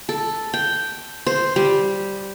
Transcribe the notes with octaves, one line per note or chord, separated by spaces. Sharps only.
A4
G5
C5
G3